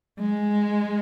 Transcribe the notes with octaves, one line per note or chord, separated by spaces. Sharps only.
G#3